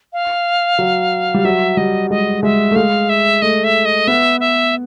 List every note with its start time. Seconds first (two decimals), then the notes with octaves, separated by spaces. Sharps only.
0.13 F5
0.79 F#3
1.34 G3
1.45 F#3 E5
1.77 G3 D#5
2.10 G#3 D#5
2.43 G#3 E5
2.71 A3
2.76 G#3 F5
3.09 E5
3.42 A3 D#5
3.64 E5
3.85 D#5
4.07 B3 E5
4.40 E5